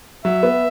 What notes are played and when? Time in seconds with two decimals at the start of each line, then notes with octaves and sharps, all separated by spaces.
0.25 F#3 E5
0.43 B3